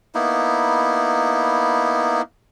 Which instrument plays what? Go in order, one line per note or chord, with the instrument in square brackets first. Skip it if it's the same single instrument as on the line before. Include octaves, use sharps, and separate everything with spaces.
[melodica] A#3 B3 D#4 E4